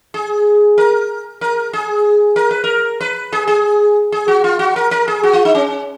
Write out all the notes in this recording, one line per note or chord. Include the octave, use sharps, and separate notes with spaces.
G#4
A#4
A#4
G#4
A#4
B4
A#4
B4
G#4
G#4
G#4
F#4
F4
F#4
A#4
A#4
G#4
F#4
F4
D#4
C#4